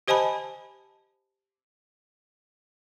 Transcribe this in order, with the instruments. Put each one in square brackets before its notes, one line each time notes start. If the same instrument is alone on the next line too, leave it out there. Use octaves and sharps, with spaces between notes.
[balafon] G4 C5 D#5 G#5 A5 B5